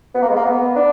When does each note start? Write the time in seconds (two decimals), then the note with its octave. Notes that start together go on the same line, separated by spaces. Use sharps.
0.15 B3
0.22 A#3
0.29 G#3
0.36 A#3
0.46 B3
0.76 D4